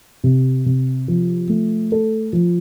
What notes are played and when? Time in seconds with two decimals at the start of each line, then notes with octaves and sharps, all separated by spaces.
0.24 C3
0.66 C3
1.08 F3
1.49 A3
1.92 A4
2.33 F3